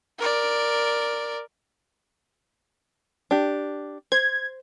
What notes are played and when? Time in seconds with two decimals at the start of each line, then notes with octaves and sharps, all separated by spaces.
0.19 A#4 D5
3.31 D4 G4
4.12 C5 G#6